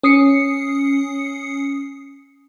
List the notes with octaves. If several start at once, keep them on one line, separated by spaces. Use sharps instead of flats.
C#4 D#6 C7 C#7